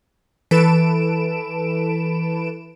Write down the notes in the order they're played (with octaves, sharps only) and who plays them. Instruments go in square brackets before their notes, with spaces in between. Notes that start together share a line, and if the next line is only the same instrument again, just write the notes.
[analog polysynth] E3 A4 B4 D7 E7